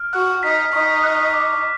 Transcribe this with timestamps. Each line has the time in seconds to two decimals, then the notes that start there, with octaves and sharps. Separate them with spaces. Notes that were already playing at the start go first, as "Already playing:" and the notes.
Already playing: F6
0.13 F#4 F#6
0.43 D#4 B6
0.73 D#4 C#6
1.04 F#6
1.33 D6